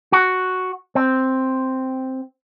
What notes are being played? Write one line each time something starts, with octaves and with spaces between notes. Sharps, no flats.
F#4
C4